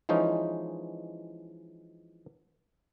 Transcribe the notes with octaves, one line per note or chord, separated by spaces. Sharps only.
E3 F3 G#3 C#4 D#4